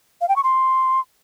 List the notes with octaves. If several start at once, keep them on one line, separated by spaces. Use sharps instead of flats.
F5
G5
C#6
C6